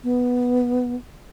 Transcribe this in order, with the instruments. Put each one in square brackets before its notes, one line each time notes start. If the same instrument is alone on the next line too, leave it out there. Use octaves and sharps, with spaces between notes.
[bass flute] B3